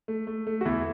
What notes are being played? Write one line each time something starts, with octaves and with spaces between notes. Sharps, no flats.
A3
A3
A3
F#4
E2 E4